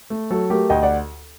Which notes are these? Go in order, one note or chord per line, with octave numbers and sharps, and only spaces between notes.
A3
F#3 A4
A3 G4 A#4
D2 D#5 G5
D5 F#5